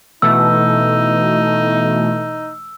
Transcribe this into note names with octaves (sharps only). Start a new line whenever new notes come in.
B2 E3 A3 D#4 E6